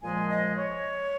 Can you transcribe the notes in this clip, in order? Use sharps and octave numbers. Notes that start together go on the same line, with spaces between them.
A#2 F3 G#3 G#5
D#5
C#5